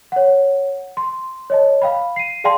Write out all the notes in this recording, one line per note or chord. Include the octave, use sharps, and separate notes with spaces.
C#5 F#5
C6
C#5 D#5 A5
F5 G5 B5
C7 D#7
G#4 D5 F5 G5 A5 C6